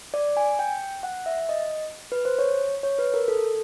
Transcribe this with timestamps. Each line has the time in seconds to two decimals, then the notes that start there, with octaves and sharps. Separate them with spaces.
0.14 D5
0.37 G#5
0.59 G5
1.03 F#5
1.26 E5
1.49 D#5
2.12 B4
2.25 C5
2.39 C#5
2.83 C#5
2.98 B4
3.14 A#4
3.28 A4